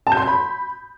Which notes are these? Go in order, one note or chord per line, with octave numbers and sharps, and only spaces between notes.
A5
G6
C6
G6
B5